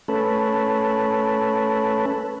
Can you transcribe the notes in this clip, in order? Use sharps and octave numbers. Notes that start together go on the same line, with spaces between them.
A3 C#4 A4 B4